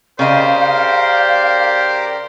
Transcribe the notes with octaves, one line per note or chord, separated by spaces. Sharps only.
C#3 G4 A#4 C5 D5 D#5 F5